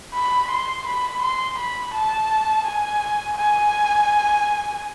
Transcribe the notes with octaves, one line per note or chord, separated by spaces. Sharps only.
B5
C6
B5
C6
B5
A5
G#5
G#5